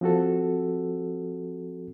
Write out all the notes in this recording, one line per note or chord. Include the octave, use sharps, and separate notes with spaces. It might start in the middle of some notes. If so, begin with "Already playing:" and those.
F3 C4 F#4 A4